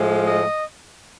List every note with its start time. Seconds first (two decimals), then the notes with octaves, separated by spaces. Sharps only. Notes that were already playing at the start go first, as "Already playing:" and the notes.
Already playing: A2 F3 G#3
0.26 D#5